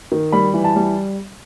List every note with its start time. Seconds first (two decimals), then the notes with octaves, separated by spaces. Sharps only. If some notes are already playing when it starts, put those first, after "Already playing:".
0.12 D#3
0.33 G3 B5
0.54 E3
0.64 A5
0.76 G3